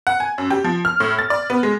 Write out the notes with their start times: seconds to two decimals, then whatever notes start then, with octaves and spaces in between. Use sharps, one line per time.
0.07 F#5
0.20 G#5
0.38 F#2
0.50 G4
0.64 F3
0.85 F6
1.00 A2
1.19 A6
1.30 D5
1.50 B3
1.63 G#3